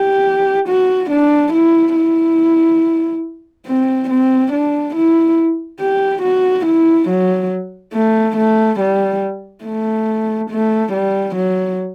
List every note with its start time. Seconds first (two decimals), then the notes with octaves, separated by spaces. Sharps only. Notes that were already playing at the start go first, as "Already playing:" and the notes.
Already playing: G4
0.68 F#4
1.10 D4
1.53 E4
1.96 E4
3.67 C4
4.10 C4
4.53 D4
4.96 E4
5.80 G4
6.23 F#4
6.65 E4
7.09 F#3
7.94 A3
8.37 A3
8.80 G3
9.64 A3
10.50 A3
10.93 G3
11.35 F#3